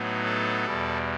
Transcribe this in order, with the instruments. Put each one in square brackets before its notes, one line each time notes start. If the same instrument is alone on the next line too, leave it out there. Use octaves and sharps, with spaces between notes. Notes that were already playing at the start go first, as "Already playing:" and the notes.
Already playing: [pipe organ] A2 F#3 B3 D#4
A4
E2 B2 G3